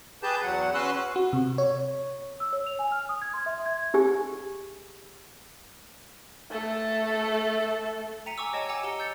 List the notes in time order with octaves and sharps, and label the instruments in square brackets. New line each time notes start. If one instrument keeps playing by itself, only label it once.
[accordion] G4 G#4 B4 A5 G6
E2 F#3 F#5
C#4 F#4 B4 C6 E6 F#6
[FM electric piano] F#4
C3
C#5
[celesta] E6
C#5
F7
G#5
F6
D#6
G#6
C6
E5
G#6
[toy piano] G4 G#4 G#5
[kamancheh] A3 A4
[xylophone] G5 A#5 B6 C#7 D#7 F7
F#5 G#5 A#5 C#6 D6 E6
G4 C#5 D#5 G5 A5 D#7
F#5 G#5 A#5 D6 E6
G4 C#7 E7 G7
A#5 E6 G6 A6 C#7